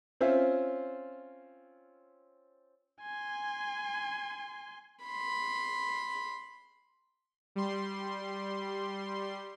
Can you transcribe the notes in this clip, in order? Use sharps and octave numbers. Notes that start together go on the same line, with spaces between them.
C4 C#4 F4 C5 E5
G#5 C6
B5 C6
G3 C6